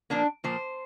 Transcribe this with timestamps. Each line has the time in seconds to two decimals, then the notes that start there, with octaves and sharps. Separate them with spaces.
0.10 A#2 F3 A#3 D4
0.44 A#2 F3 A#3 C5